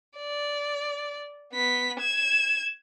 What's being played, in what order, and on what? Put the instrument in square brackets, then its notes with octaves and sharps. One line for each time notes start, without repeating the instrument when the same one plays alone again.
[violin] D5
B3 B6
G#6 E7